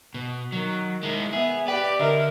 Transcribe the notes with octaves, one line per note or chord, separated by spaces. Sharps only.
B2
D#3 F#3
D#3 G#3 E4
B3 G#4 E5
G4 B4 D5 G5
D3 A#4 D#5 E5